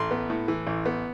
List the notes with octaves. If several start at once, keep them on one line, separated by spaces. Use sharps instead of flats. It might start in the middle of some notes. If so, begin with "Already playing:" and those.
Already playing: A1 C6
B3
A2
E3
A1
B3